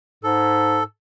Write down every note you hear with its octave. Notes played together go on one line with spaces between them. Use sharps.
G#2 A4